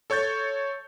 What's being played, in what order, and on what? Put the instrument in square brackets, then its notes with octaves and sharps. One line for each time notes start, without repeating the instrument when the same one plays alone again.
[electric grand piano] A4 C#5 C#6 G6 A6